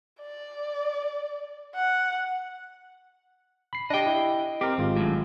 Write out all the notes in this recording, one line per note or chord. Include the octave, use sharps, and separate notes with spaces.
D5
F#5
B5 C7
D4 G4 D#5 G5
E4
C4 G4 A#4
G#1 G#3 F4
F#2 A2